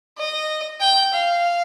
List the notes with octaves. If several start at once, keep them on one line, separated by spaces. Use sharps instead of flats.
D#5
G5
F5